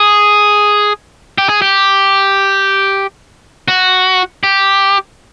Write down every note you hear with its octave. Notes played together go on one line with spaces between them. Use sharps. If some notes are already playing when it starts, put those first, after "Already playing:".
Already playing: G#4
G4
G#4
G4
F#4
G4